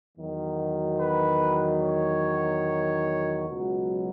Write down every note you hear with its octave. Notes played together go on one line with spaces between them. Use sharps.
E2 D#3 F#3
B4
C#5
C#2 B2 F#3